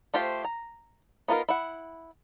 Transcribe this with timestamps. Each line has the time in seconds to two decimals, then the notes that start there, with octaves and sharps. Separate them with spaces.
0.14 A3 F4 G4 C5
0.44 A#5
1.28 B3 D#4 F4 A4 A#4
1.49 E4 F#5